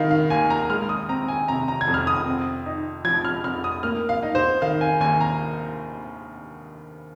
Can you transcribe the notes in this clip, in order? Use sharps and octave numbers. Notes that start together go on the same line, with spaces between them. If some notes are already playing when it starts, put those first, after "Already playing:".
Already playing: D#3 D#4 F5
F5
D#2 G#5
A#5
G#3 F6
D#6
C4 A#5
G#5
C3 A#5
A#5
G#6
F2
F6
D#6
C4
D#4
F3 G#6
F6
F2 F6
D#6
A#3 F6
F5
D#4
C5
D#3 F5
G#5
D#2 G#5
A#5